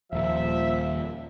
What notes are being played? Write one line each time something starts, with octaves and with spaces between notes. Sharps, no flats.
D#1 A#2 F3 E5